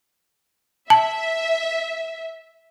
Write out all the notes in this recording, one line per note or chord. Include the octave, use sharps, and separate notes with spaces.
E5 A5